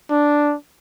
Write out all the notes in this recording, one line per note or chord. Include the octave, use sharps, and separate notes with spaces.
D4